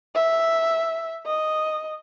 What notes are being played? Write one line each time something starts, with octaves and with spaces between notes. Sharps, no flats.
E5
D#5